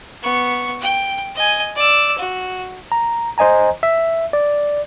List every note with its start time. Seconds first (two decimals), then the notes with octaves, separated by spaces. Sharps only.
0.22 B3 C#6
0.81 G5
1.36 D#5 G#5
1.75 D5 E6
2.18 F#4
2.92 A#5
3.38 C5 D#5 G#5 A#5
3.83 E5
4.33 D5